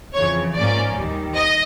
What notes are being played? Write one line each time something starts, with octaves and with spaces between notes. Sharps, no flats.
F2 C#3 E3 C#5
G#2 F3 A#3 C#4 D5
D#2 D#3 G3
D#5